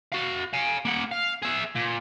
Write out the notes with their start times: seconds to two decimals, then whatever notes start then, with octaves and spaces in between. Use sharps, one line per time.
0.12 F#4 F5
0.53 F5 G#5
0.85 A#3 F#5
1.12 F5
1.43 G#4 E5
1.76 A#2